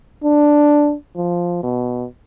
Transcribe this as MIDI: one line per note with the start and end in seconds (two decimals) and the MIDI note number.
0.23 0.95 62
1.17 1.61 53
1.63 2.06 47